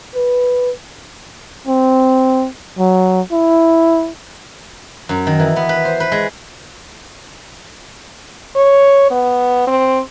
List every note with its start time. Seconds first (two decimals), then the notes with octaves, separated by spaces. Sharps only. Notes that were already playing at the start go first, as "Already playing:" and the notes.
0.15 B4
1.67 C4
2.78 F#3
3.32 E4
5.09 F#2
5.27 D#3
5.39 E3
5.56 B3
5.69 B4
5.85 C5
6.00 B4
6.12 G#3
8.56 C#5
9.11 B3
9.67 C4